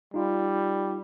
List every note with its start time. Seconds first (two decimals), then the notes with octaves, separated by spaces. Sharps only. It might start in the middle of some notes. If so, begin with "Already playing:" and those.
0.14 G3 D#4 F4